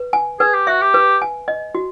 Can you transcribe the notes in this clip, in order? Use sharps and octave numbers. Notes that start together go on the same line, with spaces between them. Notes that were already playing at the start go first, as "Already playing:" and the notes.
Already playing: B4
G#5
G#4 B4
G4
F#4 E5
G4
B4
G#5
D#5
F#4